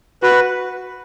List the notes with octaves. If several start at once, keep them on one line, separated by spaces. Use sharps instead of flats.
F#4 B4